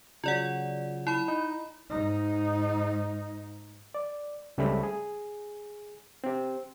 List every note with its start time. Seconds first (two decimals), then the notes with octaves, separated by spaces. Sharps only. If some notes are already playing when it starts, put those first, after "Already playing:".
0.24 C#3 F#3 F4 D5 F#5
1.07 E4 B5
1.28 D#4
1.90 G#2 D#4
3.94 D5
4.58 C#2 C#3 G3 A3 C4 B5
4.83 G#4
6.24 C4 G4